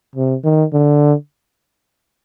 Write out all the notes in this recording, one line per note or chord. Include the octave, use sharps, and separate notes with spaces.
C3
D#3
D3